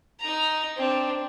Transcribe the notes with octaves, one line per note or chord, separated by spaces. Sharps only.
D#4 A#5
C4 D4